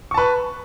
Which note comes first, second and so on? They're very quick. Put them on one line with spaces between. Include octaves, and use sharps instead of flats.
C#6 A5 B4